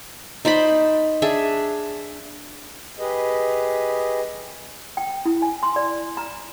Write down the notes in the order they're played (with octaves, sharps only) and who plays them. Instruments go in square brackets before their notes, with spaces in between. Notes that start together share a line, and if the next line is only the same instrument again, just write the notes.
[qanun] D#4 C5 D5 B5
D4 G#4 E5
[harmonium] G4 G#4 B4 D#5
[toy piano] G5
E4
G#5
C6
D5
A#5